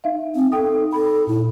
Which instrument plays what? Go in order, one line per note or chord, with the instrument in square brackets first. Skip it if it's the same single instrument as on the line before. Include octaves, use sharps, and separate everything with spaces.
[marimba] D#4 E5 F5
[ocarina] C4
[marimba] D#4 G5 D#6 [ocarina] A4
[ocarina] A4 [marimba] B5
[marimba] A#2 [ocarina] E4